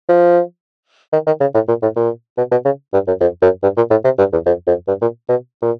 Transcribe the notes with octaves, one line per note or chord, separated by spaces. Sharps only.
F3
D#3
D#3
C#3
A2
A#2
A2
A#2
B2
B2
C#3
G2
F#2
F2
F#2
G2
A#2
A2
C3
G2
E2
F2
F2
G2
A#2
B2
A#2